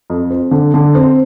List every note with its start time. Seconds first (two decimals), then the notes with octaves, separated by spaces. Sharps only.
0.10 F2
0.31 C4
0.51 D3
0.74 D3
0.95 C4